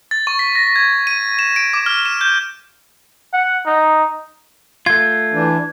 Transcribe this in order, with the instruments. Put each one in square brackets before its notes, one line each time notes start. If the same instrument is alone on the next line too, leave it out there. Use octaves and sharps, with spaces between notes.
[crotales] A6
C#6
B6
A#6
G#6
D#7
E7
D7
D6
F6
E7
G6
[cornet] F#5
D#4
[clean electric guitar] A3 F4 [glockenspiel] G#6
[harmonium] E3 D4